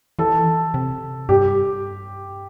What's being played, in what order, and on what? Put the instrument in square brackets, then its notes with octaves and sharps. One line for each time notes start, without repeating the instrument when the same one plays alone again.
[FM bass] E3 [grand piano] A4
[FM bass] C3
[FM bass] G2 [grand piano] G4